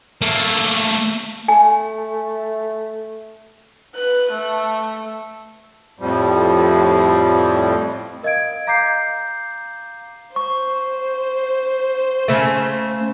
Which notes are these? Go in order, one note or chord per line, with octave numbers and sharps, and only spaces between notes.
A3 A#3
A3 G#5
B4 F#6
A3
F2 A2 F3 G3
A#4 D#5 F5 G#6 D7
F5 A#5 D6 G6 C7
C5 C#6
C#3 A3